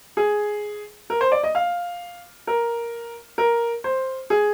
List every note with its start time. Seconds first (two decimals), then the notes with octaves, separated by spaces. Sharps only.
0.17 G#4
1.10 A#4
1.21 C5
1.32 D5
1.43 D#5
1.55 F5
2.47 A#4
3.38 A#4
3.84 C5
4.30 G#4